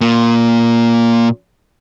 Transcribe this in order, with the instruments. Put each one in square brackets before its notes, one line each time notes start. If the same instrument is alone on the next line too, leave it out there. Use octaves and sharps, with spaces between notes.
[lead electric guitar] A#2 A#3